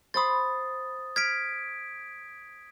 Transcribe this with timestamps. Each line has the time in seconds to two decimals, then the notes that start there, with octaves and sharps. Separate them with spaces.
0.14 C5 B5 C6 D#6 A6
1.16 F6 G#6 B6 D7